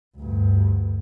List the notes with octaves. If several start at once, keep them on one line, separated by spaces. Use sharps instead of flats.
D2 G2